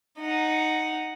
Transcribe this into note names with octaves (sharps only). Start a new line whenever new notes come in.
D#4 F#5